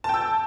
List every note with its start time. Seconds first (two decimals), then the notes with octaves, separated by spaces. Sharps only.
0.04 A5
0.09 G5
0.14 E6